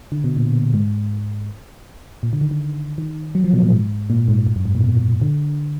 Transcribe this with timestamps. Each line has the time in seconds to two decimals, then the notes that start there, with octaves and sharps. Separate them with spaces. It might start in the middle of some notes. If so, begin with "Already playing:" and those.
0.12 D3
0.24 B2
0.37 A#2
0.74 G#2
2.23 A#2
2.33 D3
2.41 D#3
2.51 D3
2.98 D#3
3.35 F#3
3.44 F3
3.53 B2
3.63 A#2
3.72 G#2
4.10 A#2
4.28 G#2
4.47 G#2
4.56 F#2
4.65 G#2
4.75 A#2
4.84 B2
5.21 D3